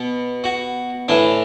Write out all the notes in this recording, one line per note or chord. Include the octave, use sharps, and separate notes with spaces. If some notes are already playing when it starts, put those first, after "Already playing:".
Already playing: B2
F#4
A2 E3 D4